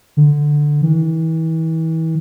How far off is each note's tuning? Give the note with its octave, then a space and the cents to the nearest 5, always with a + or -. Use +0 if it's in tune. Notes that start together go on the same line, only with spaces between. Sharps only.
D3 +5
E3 -35